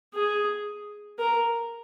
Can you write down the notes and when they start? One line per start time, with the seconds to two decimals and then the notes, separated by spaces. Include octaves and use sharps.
0.14 G#4
1.19 A#4